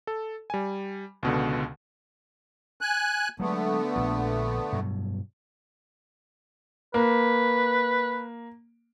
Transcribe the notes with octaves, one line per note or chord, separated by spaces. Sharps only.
A4
G3 G#5
C#2 B2 D3
G#5 F#6
D3 F#3 G#3 A3 B3
A#1 F3
G2 B2 F#3
A#3 B4